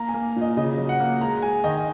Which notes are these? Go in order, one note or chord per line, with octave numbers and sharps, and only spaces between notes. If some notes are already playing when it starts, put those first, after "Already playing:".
Already playing: A#3 A#5
G#5
A#3
A#2
D#5
C#3 D#5
F#3
F#5
A#3
G#3 A#5
G#3 G#5
D#3 D#5